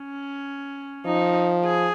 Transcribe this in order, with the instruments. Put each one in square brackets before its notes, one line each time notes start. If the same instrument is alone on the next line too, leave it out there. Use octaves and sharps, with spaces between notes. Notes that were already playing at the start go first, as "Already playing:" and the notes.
Already playing: [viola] C#4
[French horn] F3 [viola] D#4
[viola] G#4